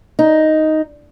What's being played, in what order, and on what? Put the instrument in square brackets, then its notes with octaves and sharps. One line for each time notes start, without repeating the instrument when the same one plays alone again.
[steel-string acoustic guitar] D#4